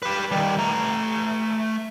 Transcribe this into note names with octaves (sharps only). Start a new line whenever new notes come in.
G4 B4
D#3 G3
A3 A#5